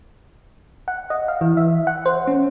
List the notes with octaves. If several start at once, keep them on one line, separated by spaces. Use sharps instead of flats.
F#5
D#5
F5
E3
E5
F#5
C5
C#4